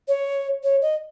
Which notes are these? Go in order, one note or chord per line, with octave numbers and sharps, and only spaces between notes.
C#5
C#5
D#5